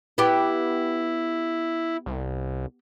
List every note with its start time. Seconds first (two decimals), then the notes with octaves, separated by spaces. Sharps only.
0.18 B3 E4 G4
2.06 C2